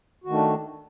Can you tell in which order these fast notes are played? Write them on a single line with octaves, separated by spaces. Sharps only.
F#4 D#3 A3 D4